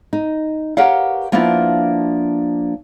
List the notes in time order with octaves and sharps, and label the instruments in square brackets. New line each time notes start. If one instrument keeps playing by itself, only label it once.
[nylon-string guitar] D#4
G4 A#4 B4 C#5 F5 F#5
F3 A#3 B3 D4 E4 F4